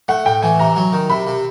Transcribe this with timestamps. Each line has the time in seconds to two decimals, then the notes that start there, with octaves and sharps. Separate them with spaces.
0.08 A3 F#5
0.25 A2 G5
0.42 E3 G#5
0.59 C3 A#5
0.76 F#3
0.93 D#3
1.10 C3 B5
1.27 C3